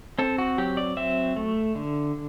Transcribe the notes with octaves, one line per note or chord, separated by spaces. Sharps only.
C4 A4
F#4
F#3 G4
D5
C4 E5
A3
D3